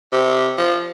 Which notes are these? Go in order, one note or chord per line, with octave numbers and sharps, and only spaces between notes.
C3
F3